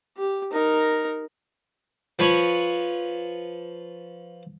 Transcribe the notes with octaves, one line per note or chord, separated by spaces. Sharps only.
G4
D#4 A#4
F3 B4 C#5